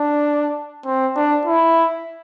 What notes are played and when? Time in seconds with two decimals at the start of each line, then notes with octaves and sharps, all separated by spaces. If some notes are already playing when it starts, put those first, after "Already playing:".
Already playing: D4
0.86 C4
1.16 D4
1.45 E4